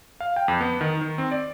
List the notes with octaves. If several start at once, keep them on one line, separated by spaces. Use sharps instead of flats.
F5
G5
F2
B3
D#3
D#3
C4
D5